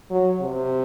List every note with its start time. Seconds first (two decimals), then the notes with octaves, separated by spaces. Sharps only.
0.10 F#3
0.40 C3